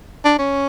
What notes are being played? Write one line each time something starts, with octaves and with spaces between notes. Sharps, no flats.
D4
C#4